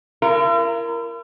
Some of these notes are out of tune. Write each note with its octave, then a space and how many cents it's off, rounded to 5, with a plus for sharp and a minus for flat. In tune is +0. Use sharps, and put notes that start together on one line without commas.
E4 +45 A#4 +0